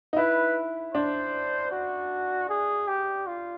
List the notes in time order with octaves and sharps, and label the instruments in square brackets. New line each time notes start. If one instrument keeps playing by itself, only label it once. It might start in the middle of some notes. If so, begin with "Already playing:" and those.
[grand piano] D#4
[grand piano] E4 [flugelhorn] B4
[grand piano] D4 [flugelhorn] C5
[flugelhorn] F#4
G#4
G4
F4